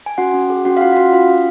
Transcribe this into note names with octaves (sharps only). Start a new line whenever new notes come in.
G#5
C#4 F#4 F#5
C#4
G#4
C#4 F#4 F#5
F5
F4 F#4 F#5
F5
C#4 F#4 F#5
F4 F5
C#4